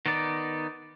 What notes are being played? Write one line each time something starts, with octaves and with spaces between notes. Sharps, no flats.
D#3 B3 D#4 D5